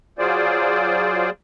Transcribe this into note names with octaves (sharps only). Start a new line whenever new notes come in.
F#3 F4 G#4 C5 D5